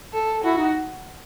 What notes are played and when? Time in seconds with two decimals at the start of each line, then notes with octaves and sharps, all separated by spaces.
0.13 A4
0.44 E4 F#4
0.57 D#4